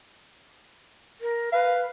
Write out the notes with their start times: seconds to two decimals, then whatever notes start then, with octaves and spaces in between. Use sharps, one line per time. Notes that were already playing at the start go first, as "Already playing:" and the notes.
1.21 A#4
1.52 B4 F5